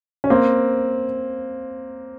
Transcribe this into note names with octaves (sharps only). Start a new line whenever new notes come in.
C#4
A#3 C4